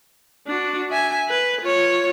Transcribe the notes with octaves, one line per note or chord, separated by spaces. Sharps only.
D4 F#4
E5 G#5
B4
F4 C#5